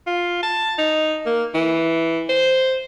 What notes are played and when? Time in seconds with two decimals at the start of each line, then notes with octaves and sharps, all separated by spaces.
0.07 F4
0.43 A5
0.78 D#4
1.26 A#3
1.54 E3
2.29 C5